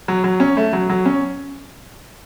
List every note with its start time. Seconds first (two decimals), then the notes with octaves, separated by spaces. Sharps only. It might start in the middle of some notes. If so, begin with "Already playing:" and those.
0.08 F#3
0.24 F#3
0.40 C#4
0.57 A3
0.73 F#3
0.89 F#3
1.06 C#4